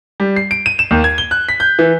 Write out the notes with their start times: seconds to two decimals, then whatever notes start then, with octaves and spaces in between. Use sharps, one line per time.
0.20 G3
0.36 C7
0.51 D7
0.66 D#7
0.79 E7
0.91 D#2
1.04 G#6
1.18 G7
1.31 F#6
1.49 B6
1.60 G6
1.79 E3